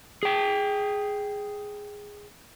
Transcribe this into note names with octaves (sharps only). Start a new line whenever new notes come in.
G#4 G5